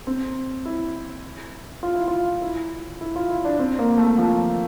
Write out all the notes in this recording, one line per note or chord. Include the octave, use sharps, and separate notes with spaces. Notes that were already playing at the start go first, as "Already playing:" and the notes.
C4
E4
F4
E4
F4
E4
E4
F4
E4
D4
C4
A#3
A3
F3